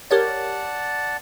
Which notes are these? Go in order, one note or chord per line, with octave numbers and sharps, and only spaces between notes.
G4 A#4 C#5 D5 F#5 A5